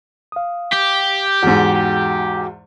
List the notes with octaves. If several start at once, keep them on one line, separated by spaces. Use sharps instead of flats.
F5 D#6
G4
E2 G#2 F#4 F#5